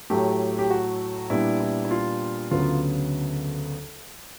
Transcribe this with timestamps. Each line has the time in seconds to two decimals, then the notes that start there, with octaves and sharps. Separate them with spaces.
0.10 A2 F#3 A3 G4
0.59 G4
0.71 F#4
1.30 A#2 G3 B3 D4 E4
1.60 E4
1.85 E4
1.91 F4
2.51 D2 C#3 F#3 B3 F4